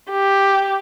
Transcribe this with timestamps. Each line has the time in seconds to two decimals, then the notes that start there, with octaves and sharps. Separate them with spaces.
0.11 G4